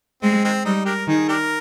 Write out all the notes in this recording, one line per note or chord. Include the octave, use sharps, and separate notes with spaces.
G#3 C4
D#3 G#3 C4
G3 G#3 C4 D#4
D4 G4 A#4
D#3 D#4 G#4
D4 G4 A#4